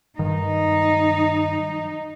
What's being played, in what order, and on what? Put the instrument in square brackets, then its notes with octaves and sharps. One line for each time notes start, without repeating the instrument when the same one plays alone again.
[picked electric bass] G2 D#3 [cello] D#4